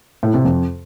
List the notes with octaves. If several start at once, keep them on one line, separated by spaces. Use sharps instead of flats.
A2
C3
F2